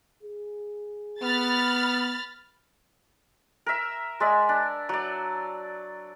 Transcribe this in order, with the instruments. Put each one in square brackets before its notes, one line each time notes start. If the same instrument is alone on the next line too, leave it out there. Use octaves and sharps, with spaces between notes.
[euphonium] G#4
[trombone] B3 [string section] B5 F6 A6
[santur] A#4 E5
G#3 D5 E5
D4
F#3 D5